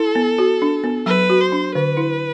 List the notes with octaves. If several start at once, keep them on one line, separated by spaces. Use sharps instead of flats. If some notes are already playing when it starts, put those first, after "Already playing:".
Already playing: E4 A4
B3
F#4
D4
B3
F#3 B4
F#4
C5
D4
D3 B4
E4